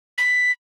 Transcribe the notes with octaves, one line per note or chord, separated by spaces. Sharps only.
B6